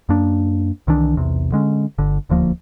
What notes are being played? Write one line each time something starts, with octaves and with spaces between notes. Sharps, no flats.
F#2 A#3 D4
C2 D#3 E3 D4
B1 E2 C3
D3 G#3 C#4
G1 D3
D#1 D2 F3 A#3